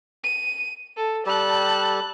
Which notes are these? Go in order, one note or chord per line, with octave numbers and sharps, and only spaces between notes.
D#7
A4
G3 G4 A4 A5 F#6